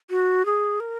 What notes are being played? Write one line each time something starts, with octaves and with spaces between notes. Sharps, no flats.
F#4
G#4
A#4